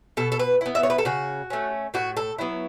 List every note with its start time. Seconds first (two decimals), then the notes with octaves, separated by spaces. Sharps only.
0.17 B2 A4
0.32 A4
0.39 B4
0.61 B3 E4
0.75 E5
0.83 C#5
0.90 B4
0.98 A4
1.05 C#3 F#4
1.50 A3 C#4
1.94 A2 F#4
2.17 A4
2.38 F#3 B3 E4